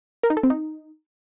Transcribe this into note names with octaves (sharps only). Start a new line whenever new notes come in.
A#4
D#4
A4
C4
D#4